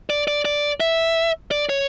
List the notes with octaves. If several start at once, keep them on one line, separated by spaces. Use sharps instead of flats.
D5
D5
D5
E5
D5
C#5